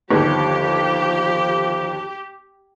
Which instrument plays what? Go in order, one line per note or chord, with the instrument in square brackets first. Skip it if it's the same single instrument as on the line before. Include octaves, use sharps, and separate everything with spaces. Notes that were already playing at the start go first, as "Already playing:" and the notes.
[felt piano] G1 D#2 [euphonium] F3 [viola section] G4